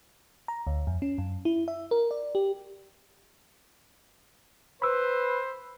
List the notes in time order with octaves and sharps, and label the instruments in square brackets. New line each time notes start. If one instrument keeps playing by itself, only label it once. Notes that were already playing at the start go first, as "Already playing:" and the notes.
[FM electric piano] A#5
D2
F2
C#4
F#2
E4
E5
A#4
D5
G4
[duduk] B4 [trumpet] C5 [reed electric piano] B5 E6